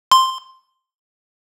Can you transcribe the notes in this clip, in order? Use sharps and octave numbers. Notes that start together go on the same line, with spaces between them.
C6